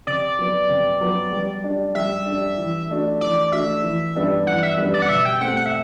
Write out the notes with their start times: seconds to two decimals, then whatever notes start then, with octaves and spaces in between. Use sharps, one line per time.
0.07 C3 D5
0.39 F#3 B3
0.69 C3
1.01 F#3 B3
1.32 G3
1.64 D4 G4
1.95 G3 E5
2.26 D4 G4
2.58 E3
2.89 A3 D4 F#4
3.21 E3 D5
3.52 A3 D4 F#4 E5
3.83 E3
4.15 G3 B3 D4 G4
4.47 E3 F#5
4.63 E5
4.78 G3 B3 D4 G4
4.94 D5
5.02 F#5
5.09 B2 E5
5.25 G5
5.40 A3 C4 G4 F#5
5.56 F#5
5.66 E5